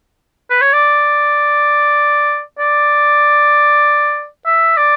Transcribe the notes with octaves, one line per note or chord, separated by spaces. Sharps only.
B4
C#5
D5
D5
E5
D5